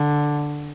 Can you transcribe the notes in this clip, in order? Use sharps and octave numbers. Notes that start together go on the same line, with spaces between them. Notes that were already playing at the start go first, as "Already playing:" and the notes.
Already playing: D3